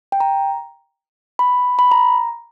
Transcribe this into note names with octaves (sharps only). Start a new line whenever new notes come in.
G5
A#5
B5
B5
A#5